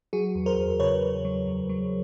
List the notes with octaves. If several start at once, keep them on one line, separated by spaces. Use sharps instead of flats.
F#3 F#4 G#4
E2
A#4 C5
E2
C#3 B4 C#5
E2
F#3
E2
F#3